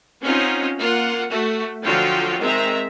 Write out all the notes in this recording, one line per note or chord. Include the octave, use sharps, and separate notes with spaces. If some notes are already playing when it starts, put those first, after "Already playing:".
C4 C#4 D#4 F4 C5 F#5
A#3 F4 F#5
A3 F#4
D3 F3 F#3 F4 F#4 G5
D#3 G#3 C4 E5 A#5